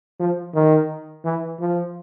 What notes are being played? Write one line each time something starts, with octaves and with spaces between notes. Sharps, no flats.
F3
D#3
E3
F3